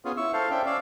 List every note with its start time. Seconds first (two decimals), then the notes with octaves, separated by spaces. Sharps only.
0.05 B3 C#4 F4 G#4
0.17 E4 C#6 E6
0.33 A4 C5 F5
0.51 C#4 D4 C5 E5 G5
0.66 C#4 D5 F5 E6